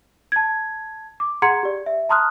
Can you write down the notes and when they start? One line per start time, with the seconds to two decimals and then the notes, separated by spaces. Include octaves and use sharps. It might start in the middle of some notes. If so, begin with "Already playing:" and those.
0.32 A5 G#6
1.20 D6
1.42 G#4 F#5 A#5 C6 G#6 C#7
1.63 G4 D5
1.86 E5
2.09 A5 A#5 C6 D#6 F6 F#6